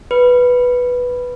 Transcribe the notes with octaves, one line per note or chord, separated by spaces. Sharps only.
B4